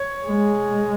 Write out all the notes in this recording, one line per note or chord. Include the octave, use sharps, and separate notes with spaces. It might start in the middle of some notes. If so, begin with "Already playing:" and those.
Already playing: C#5
G#3